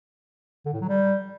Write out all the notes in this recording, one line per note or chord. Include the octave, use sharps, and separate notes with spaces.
D3
A2
F#3
G3